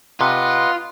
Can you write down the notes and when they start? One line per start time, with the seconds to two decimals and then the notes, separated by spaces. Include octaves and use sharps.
0.21 C3 F4 B4 D#5 F#5